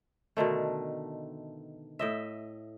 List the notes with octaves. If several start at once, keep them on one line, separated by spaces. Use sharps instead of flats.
B2 D3 D#3 A3
A2 D#5 E5